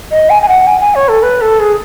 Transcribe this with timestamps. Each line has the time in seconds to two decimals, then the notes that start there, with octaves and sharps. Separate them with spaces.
0.11 D#5
0.30 G#5
0.42 G#5
0.48 F#5
0.67 G#5
0.81 G#5
0.95 C#5
1.09 A4
1.23 B4
1.41 A4
1.60 G#4